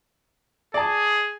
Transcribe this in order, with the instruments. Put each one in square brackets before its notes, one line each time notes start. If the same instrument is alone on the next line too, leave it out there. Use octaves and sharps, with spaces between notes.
[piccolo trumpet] G#4 [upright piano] D5 A5